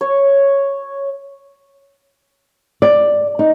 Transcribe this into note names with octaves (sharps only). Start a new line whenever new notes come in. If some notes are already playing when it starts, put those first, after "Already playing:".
C#5
D5
D#4